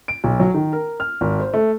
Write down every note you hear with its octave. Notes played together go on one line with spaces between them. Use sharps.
D7
B1
F#3
D#3
A#4
F6
G#1
C5
A3